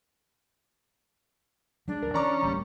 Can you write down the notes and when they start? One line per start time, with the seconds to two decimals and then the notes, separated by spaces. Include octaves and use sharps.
1.88 F#3 G#3 D4
2.03 D2 F#3 A#4
2.14 E3 C#4 D5 A#5 D6
2.43 D1 D2 G3 A#3